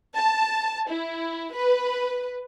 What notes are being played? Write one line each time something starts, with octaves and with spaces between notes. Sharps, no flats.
A5
E4
B4